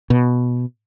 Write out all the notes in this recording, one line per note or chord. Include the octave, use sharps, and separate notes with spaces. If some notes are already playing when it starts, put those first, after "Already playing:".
B2